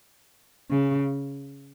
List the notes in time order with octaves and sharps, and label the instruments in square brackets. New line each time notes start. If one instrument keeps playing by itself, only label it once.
[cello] C#3